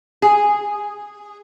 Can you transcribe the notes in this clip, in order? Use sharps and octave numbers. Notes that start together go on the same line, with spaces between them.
G#4